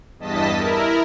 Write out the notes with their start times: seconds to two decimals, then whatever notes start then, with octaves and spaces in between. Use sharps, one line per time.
0.19 E2 G2 D#5 A5 B6
0.56 E4 A#4